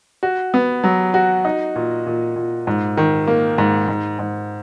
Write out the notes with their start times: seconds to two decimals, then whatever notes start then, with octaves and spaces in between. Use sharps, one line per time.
0.23 F#4
0.54 B3
0.84 F#3
1.14 F#4
1.45 D#4
1.76 A#2
2.06 A#2
2.36 A#2
2.67 G#2
2.97 D#3
3.27 A#3
3.58 G#2
3.88 G#2
4.19 G#2